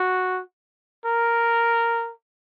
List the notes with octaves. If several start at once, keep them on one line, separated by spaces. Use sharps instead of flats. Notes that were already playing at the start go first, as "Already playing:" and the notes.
Already playing: F#4
A#4